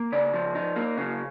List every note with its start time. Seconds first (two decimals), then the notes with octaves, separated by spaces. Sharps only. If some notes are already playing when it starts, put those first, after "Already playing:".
Already playing: A#3
0.12 C#3 D5
0.34 F3
0.55 D#4
0.76 A#3
0.98 C#3